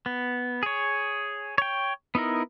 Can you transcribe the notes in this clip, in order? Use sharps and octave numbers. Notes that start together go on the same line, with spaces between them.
B3
G#4 C#5
C#5 G5
B3 D#4 E4 A#4